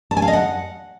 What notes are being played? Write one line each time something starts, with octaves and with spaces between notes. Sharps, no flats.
A5
G#5
F5
D#5
F#5